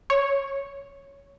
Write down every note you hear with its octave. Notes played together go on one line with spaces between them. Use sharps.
C#5